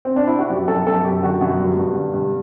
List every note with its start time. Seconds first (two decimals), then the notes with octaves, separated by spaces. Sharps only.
0.05 C4
0.16 D4
0.27 E4
0.39 F#4
0.50 F#2 G4
0.68 F#2 A4
0.87 F#2 A4
1.04 F#2 G4
1.23 D3 F#4
1.41 F#2 F#4
1.60 G2
1.77 G2
1.95 D3
2.14 G2